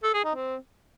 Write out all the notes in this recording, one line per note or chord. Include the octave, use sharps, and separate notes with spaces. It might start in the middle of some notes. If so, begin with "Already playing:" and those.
A4
G#4
D#4
C4